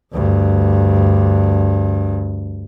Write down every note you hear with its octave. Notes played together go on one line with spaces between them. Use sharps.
D2 G2